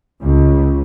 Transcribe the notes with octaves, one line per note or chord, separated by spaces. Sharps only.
C#2